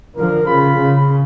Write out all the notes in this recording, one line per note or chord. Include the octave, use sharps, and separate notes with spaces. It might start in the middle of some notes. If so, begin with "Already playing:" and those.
D3 F3 A#4
C#3 F4 B5
C#3